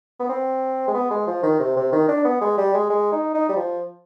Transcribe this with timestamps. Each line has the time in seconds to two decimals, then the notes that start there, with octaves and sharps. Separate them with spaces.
0.20 B3
0.29 C4
0.88 G#3
0.94 B3
1.11 G#3
1.27 F3
1.43 D#3
1.59 C3
1.77 C3
1.93 D#3
2.08 D4
2.25 B3
2.41 G#3
2.58 G3
2.74 G#3
2.90 G#3
3.12 D#4
3.34 D#4
3.49 G3
3.56 F3